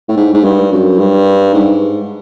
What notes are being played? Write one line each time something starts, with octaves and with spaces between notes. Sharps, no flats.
A2
G#2
G#2
G2
F#2
G2
G#2